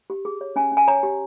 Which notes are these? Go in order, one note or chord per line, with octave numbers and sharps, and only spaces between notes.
G4
G#4
C#5
C#4 G#5
C#4
G#5
C#5 A#5
G4